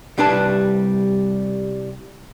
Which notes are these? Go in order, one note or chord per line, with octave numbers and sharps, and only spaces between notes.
C2 G3 D4 B4 A5